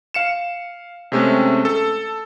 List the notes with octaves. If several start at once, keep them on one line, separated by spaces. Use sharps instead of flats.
F5 C#7 E7
C3 G#3 A3 C4 C#4
A4